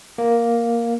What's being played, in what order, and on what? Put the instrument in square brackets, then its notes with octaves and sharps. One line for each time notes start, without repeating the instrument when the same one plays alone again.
[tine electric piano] A#3